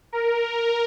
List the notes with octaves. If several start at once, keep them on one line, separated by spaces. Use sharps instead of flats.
A#4
A#4